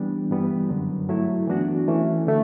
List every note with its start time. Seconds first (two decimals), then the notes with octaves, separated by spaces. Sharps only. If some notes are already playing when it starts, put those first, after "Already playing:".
Already playing: E3 G3 B3 D4
0.30 G2 E3 G3 B3
0.69 F#2 D3 F#3
1.08 G2 F#3 A3 E4
1.48 E3 B3 D4 F#4
1.88 E3 A3 C#4
2.26 D3 A3